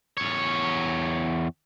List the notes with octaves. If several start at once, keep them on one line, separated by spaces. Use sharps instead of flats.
E2 C#5